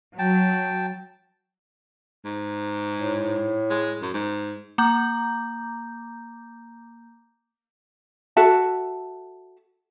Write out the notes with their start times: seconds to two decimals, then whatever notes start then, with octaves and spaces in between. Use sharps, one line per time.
0.19 F#3 G5 A5
2.24 G#2
2.96 A2
3.70 G#3
4.02 F#2
4.14 G#2
4.78 A#3 A#5 D6 G6
8.37 F#4 A4 E5 A5